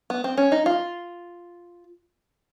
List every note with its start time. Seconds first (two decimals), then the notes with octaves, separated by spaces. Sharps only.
0.10 B3
0.24 C4
0.37 C#4
0.52 D#4
0.66 F4